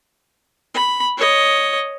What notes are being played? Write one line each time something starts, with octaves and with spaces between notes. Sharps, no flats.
B5
C#5 D#5